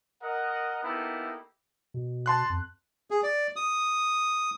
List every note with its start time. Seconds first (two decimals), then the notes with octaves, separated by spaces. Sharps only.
0.22 A#4 D#5 F#5
0.83 A#3 B3 D#4 E4 G4 A4
1.94 B2
2.26 A5 C6 F#6
2.50 F2
3.11 G#4
3.23 D5
3.56 D#6